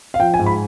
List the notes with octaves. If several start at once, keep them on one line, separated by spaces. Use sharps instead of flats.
F5
F3 G5
G#5
G#2
B5